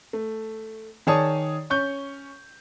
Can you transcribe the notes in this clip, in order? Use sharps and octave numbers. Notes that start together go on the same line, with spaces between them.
A3
D#3 G#4 C#5 D5 A5 D#6
C#4 C#6 G6